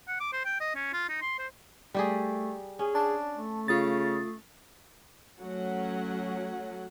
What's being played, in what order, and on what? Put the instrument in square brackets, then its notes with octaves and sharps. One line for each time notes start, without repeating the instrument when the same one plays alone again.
[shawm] F#5
D6
C5
G5
D#5
C#4
F4
D#4
C6
C5
[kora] G3 G4 G#4 [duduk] A3
[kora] C#4 [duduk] G#4
[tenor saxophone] D4 [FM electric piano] A5
[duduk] A3
[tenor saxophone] C#3 [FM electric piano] F4 D#6 A6
[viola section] F#3 A3 C#4 F#5